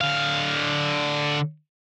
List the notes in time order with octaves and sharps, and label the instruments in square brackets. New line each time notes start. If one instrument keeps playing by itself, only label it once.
[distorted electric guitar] D3 F5